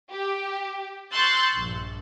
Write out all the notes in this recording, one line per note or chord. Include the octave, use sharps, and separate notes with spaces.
G4
C6 C#6 E6 F#6 G6 A6
A#1 G2